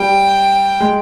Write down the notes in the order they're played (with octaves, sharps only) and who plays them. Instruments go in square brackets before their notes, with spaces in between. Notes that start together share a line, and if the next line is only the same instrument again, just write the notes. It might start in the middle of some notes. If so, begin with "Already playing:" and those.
Already playing: [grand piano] G3 [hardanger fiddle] G5
[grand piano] G#3